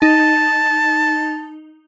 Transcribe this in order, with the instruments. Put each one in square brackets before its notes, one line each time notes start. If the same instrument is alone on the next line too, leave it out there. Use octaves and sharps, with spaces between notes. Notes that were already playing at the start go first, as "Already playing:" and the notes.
[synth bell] D#4 [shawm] A5